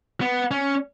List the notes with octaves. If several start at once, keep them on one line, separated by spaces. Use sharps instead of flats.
B3
C#4